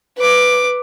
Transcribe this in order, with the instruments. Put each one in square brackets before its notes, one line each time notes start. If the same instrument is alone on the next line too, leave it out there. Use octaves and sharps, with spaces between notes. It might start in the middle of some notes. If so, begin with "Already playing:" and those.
[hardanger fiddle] B4 D6